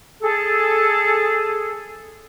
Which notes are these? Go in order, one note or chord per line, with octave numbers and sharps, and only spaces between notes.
G#4 A4